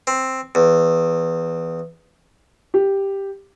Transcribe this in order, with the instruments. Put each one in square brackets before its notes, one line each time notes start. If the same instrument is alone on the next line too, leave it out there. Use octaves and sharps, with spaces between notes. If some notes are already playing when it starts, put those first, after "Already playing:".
[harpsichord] C4
E2
[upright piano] G4